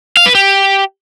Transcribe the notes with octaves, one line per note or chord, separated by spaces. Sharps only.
F5
B4
G4